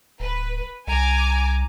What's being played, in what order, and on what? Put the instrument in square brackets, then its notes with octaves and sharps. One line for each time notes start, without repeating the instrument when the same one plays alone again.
[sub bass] D1 [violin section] B4
[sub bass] C2 [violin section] G#5 A#5 D6